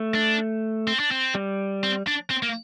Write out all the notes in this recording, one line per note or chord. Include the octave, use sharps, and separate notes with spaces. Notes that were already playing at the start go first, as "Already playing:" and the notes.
Already playing: A3
D4
C4
D4
C4
G3
C4
D4
C4
A#3